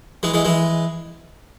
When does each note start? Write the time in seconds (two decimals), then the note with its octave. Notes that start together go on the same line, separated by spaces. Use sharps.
0.23 E3 G#3
0.34 E3 G#3
0.45 E3 G#3